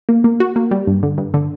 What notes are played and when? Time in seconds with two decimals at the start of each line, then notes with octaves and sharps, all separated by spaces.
0.09 A#3
0.24 A#3
0.40 F#4
0.56 A#3
0.71 G3
0.87 G2
1.03 D3
1.18 G2
1.34 D3